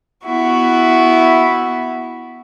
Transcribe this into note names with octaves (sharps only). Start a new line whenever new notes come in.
B3 E4 F#4